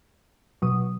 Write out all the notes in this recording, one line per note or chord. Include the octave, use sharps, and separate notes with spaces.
B2 F#3 D#6